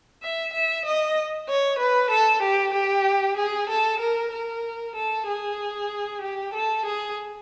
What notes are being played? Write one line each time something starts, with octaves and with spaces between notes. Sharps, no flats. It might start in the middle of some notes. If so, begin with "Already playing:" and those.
E5
E5
D#5
C#5
B4
A4
G4
G4
G#4
A4
A#4
A#4
A4
G#4
G4
A4
G#4